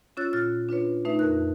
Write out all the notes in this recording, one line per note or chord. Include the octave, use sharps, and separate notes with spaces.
C#4 F4 C#5 E6 F#6 A6
A#2 F4 F6 F#6 A6
D4 F4 B4 C#5
A3 D#4 B4 E5
F2 A#4 F#6